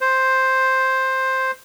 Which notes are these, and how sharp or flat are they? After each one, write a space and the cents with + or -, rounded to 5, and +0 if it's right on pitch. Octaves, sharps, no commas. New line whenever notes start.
C5 +5